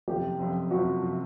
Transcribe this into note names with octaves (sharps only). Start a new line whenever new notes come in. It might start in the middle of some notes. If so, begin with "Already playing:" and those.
F#1 F2 C3 F3 G4
F#1 F2 C3 F3
F#1 F2 C3 F3 F#4
C3 F3